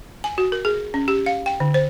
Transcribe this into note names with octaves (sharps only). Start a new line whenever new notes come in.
G#5
F#4
A#4
G#4
C#4
G4
F5
G5
D3
C5